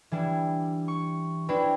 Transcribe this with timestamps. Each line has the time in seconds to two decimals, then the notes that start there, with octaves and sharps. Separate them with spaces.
0.12 E3 G3 D4 E4
0.88 C#6
1.49 E3 C4 D4 E4 G4 B4